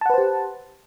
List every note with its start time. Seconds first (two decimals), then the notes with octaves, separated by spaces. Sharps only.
0.01 A5
0.06 F#5
0.10 B4
0.14 C5
0.18 G4